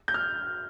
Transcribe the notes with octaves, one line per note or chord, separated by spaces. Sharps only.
G6
F6